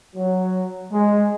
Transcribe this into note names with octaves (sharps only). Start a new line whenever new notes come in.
F#3
G#3